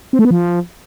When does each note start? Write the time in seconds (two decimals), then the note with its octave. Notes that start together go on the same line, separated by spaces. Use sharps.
0.13 C4
0.19 A3
0.25 B3
0.31 F3